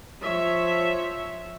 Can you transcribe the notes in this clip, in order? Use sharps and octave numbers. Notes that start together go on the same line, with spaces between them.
F3 C#5 E5